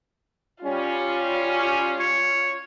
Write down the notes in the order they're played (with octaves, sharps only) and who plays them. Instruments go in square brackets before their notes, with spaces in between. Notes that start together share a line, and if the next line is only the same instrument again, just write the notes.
[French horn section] G3 C#4 [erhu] F4
[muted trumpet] C#5